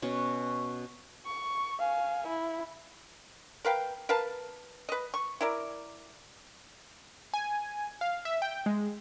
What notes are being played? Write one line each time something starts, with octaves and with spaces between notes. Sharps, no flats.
B2 C#4 F#4
C#6
F5 G#5
E4
A#4 B4 F5 G5
A#4 B4 F5 A5
B4 D#5
C#6
E4 A#4 D5
G#5
F5
E5
G5
G#3